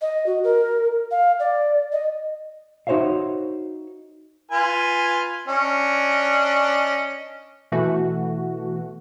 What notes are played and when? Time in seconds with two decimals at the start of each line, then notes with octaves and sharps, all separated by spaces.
0.02 D#5
0.26 F#4
0.44 A#4
1.11 F5
1.39 D5
1.92 D#5
2.87 D#4 F#4 C5 C#5 E5 F5
4.51 F4 B4 G#5
5.48 C#4 D4 D#5
7.72 B2 E3 A3 F#4